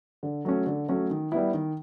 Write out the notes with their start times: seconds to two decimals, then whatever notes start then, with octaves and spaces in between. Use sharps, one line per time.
0.23 D3
0.45 F#3 A3 C#4
0.66 D3
0.89 F#3 A3 C#4
1.10 D#3
1.32 G3 B3 E4
1.54 D#3